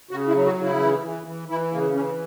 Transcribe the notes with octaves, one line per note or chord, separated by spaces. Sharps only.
C#3 F#4
E4
F#3
F#4
C#3
E4
E3
E3
E3
E3 E4
C#3 A#3
E3 C#4